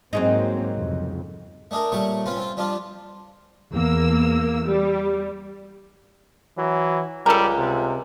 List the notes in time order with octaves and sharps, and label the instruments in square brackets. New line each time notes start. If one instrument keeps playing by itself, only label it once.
[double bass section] G#2 A#3 C4 [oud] F#3 G#3 D#4
[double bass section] C2 F2 C#3
[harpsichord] A3 D4 G#4 A#4
A#2 G3 A3 C#5 C#6
C4 C#4 F4 B4
C4 F4
F3 G3 D4 F4
[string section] E2 A#3 E6
G3
[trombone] E3 [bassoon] F#3
[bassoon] C#2 [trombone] G3 [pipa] A4 A#4
[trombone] C3